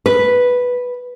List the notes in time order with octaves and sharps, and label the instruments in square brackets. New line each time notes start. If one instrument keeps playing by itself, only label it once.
[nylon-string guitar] B4